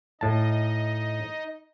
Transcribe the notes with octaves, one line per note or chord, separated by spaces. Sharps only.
A2 D#4 D#5 A5